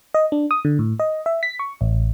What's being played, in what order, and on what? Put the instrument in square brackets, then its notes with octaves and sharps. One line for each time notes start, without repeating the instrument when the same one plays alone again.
[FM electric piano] D#5
D4
D#6
D3
A2
D#5
E5
B6
C#6
A1